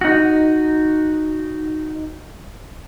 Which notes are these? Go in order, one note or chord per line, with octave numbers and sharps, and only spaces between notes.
D#4 F#4